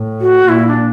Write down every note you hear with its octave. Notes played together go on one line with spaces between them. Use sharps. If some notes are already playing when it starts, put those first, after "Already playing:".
Already playing: A2
F#4
A#2 E4
D4